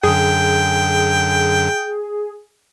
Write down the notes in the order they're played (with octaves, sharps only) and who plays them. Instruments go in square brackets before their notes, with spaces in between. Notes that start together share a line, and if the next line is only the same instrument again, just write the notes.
[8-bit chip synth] F#2 D3 [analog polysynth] G#4 [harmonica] G5